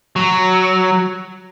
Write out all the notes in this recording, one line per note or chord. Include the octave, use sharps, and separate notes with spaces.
F#3